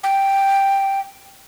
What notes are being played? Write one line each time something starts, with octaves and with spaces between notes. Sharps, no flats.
G5